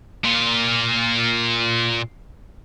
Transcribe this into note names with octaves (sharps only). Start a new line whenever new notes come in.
A#2 F4